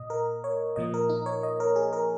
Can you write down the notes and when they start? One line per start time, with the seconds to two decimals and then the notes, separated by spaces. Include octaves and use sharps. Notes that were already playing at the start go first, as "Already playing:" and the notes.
Already playing: A#2 D#5
0.10 A#4
0.44 C#5
0.76 A#2 F3 A#3 D#5
0.94 A#4
1.09 D#4
1.26 C#5
1.43 D#5
1.60 A#4
1.76 G#4
1.93 A#4